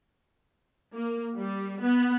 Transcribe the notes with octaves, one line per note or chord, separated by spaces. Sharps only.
A#3
G3
B3